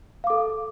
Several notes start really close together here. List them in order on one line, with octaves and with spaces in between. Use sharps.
F5 D6 A4